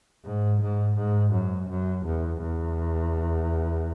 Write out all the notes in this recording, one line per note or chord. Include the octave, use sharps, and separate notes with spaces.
G#2
G#2
G#2
F#2
F#2
E2
E2